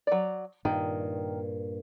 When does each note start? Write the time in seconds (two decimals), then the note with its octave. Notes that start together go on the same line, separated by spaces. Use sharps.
0.07 F#3 D5
0.65 G2 A#2 D#3